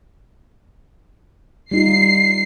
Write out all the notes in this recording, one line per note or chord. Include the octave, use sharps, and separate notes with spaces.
G3 D#4 F4 C7